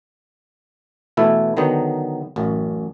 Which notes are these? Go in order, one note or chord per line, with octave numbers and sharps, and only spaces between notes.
B2 E3 A3 E4
D3 D#3 F#3 B3 D#4
A1 F#2